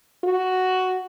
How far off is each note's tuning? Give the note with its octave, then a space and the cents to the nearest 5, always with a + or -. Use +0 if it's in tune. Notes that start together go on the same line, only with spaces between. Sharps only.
F#4 +5